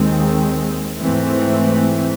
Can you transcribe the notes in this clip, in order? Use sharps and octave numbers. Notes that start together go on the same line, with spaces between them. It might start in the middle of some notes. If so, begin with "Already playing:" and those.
Already playing: D#2 D#3 G#3 C4
G#2 E3 A3 C4